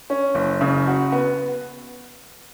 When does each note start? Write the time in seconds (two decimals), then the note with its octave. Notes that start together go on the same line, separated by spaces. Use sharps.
0.10 C#4
0.35 F#1
0.61 C#3
0.87 F#4
1.12 B3